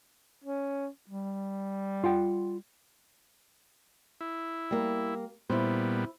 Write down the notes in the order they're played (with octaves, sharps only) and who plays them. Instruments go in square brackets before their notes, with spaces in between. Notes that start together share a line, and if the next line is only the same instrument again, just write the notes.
[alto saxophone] C#4
G3
[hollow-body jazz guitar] F4 F#5 G5
[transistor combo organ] E4
[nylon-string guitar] G3 A#3
[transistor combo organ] A#2 G3 B3 [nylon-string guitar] E4 C5